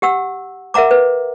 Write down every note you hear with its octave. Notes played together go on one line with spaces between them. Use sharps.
G4 F#5 E6
A#4 E5 F#5 A#5 D6
B4